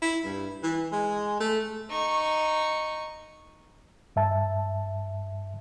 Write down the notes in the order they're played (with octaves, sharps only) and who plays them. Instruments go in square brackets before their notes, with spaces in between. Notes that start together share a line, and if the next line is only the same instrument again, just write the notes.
[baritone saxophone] E4
G2
E3
G#3
A3
[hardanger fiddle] D#4 C#6
[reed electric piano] G2 E5 A5